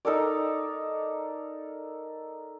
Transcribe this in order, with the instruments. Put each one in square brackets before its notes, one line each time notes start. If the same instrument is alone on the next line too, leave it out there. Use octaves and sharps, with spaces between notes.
[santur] D#4 A4 A#4 D5